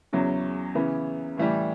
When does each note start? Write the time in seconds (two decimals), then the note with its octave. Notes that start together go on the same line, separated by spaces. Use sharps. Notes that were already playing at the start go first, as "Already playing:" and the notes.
0.13 E2 C#3 F#3 C#4 E4
0.75 C#3 E3 B3
1.38 A2 E3 G3